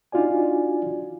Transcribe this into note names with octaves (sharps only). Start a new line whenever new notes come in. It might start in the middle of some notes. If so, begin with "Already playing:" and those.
D4 D#4 F4 F#4 D5 G#5